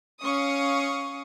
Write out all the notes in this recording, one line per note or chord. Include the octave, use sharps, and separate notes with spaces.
C#4 F5 C#6 D#6